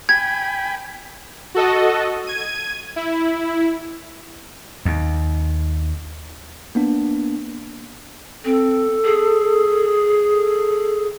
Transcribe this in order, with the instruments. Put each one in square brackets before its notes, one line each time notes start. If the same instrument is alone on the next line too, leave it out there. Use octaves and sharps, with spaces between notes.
[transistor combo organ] G5 G#5 B5 [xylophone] G#6
[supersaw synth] F#4 A4 D#5
G#6 D#7
E4
[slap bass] D#2
[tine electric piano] A#3 B3 D4
[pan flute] C4 [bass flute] A4
[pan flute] G#4
[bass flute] A4